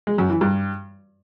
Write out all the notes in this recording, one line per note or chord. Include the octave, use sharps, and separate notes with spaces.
G#3
F#2
E3
G2